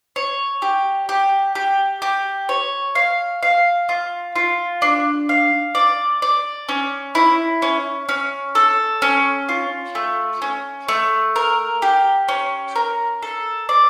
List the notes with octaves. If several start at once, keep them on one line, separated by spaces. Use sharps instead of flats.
C#5
G4
G4
G4
G4
C#5
F5
F5
F4
F4
D4
F5
D5
D5
C#4
E4
C#4
C#4
A4
C#4
F4
A3
C#4
A3
A#4
G4
C#4
A#4
A4
D5